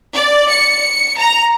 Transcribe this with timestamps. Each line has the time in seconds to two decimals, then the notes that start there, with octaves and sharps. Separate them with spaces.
0.14 D5
0.50 C#7
1.19 A#5